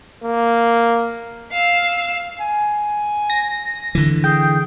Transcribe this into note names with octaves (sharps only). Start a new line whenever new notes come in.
A#3
F5 E6
G#5
A#6
D3 E3
G#4 G5